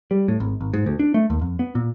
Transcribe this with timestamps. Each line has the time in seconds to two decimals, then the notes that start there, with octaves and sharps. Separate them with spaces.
0.11 G3
0.28 A2
0.40 G#1
0.61 G#1
0.74 G#2
0.86 D2
1.00 D4
1.14 A3
1.30 D#2
1.41 F2
1.59 B3
1.75 A#2